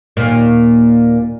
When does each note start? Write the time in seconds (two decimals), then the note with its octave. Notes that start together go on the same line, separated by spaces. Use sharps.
0.17 D#2 A#2